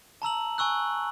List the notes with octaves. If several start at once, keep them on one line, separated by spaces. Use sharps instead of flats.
A5 A#5 E6 F#7
G#5 C#6 E6 F#6